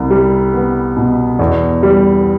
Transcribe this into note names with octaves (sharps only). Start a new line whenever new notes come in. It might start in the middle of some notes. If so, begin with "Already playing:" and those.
Already playing: C2
G3
B3
B2
E2
G3